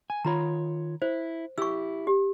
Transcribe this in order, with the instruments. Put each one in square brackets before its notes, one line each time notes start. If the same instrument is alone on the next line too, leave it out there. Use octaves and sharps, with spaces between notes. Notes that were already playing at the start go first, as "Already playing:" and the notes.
[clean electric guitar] G#5
[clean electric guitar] D#3 F4 C#5 [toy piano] A#5 B5
[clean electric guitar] E4 [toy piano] C5
[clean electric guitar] E4 G4 [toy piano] C#6 E6
[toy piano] G4